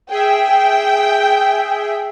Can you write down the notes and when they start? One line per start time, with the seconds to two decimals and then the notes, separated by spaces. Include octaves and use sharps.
0.11 G#4 E5 G5